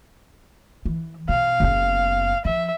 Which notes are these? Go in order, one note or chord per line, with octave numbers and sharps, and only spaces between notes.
E3
B2 F5
F#1 B3
F3 E5